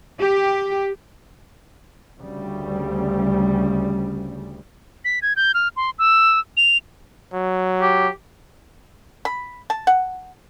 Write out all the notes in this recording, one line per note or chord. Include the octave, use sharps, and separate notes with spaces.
G4
D2 C#3 G3
B6
G#6
G6
F6
C6
E6
F7
F#3
G4
B5
A5
F#5